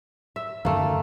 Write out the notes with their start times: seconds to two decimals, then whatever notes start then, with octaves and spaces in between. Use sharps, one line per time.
0.36 E5
0.65 F#2 D3 D#3 A3 A#3